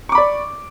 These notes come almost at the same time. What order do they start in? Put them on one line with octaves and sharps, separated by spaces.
C#6 D6 B5 D5